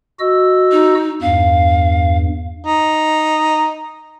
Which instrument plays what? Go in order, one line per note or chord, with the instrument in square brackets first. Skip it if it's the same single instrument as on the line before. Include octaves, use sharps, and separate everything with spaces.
[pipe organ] F#4 D#5 E6
[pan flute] D#4
[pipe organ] E2 G2 [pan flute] F5
[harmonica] D#4